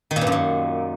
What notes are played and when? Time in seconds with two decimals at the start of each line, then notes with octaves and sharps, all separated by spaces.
0.11 D#3
0.16 A#2
0.21 G2
0.27 F#2
0.32 A#2